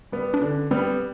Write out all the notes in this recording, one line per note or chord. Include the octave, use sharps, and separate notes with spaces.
G3 B3
D4
D3 C#4
G3 B3 C4